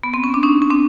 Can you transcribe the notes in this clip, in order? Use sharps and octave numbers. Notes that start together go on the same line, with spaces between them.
B3
C4
C#4
D4
C#4 D#4
C#4
C4 D4